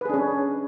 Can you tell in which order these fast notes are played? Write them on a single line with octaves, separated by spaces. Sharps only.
B4 G#4 D4 C#4